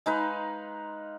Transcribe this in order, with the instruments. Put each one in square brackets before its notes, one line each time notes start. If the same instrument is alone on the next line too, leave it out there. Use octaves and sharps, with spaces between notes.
[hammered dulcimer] G#3 D#4 B4 F5